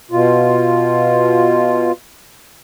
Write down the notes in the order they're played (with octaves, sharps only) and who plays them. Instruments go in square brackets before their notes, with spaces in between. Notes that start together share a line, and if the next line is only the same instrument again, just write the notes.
[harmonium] B2 F4